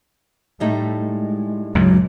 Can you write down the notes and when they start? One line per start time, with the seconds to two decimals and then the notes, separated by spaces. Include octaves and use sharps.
0.60 A2 G3 A3 D#4
0.96 G#3
1.75 C#2 G2 A#2 F#3